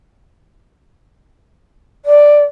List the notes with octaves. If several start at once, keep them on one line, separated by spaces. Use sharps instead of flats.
D5